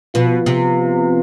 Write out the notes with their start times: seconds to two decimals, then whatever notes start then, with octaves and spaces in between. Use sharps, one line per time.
0.14 B2 F3 B3 F4
0.46 C3